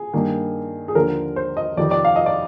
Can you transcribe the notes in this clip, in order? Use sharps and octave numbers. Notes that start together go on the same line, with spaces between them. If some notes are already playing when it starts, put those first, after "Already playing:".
Already playing: G#4
G2 D#3 A#3
G#4
D#2 D3 F3 A#4
C5
D#5
F2 C3 D#3 D5
D5
F5
D#5
D5